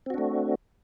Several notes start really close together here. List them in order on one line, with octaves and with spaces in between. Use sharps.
C4 F#4 D4 A3